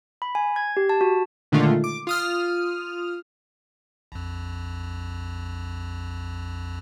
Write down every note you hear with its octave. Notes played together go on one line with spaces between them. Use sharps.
B5
G#5
G#6
G4
A5
F#4
A#2 D3 D#3 G#3 A3 F4
D6
F4 D#6 F6
A#1 F2